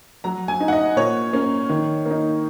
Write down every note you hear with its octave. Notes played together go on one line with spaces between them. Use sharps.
F#3 A#5
G#5
D#4
F#5
D#5
A#2 C#5
A#3 C#4
D#3
A#3
D#4